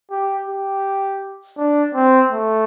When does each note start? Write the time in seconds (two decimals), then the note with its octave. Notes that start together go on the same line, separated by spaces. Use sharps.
0.11 G4
0.49 G4
1.58 D4
1.95 C4
2.32 A3